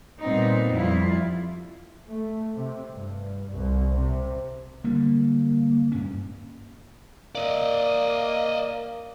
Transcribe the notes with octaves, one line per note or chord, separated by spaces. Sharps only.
A#2 G3 B3 C4 D#4
F2 G3 E4 F4
A3
C3
G2
C2
C3
D3 G3 A#3
G2 C#4
A#3 D5 D#5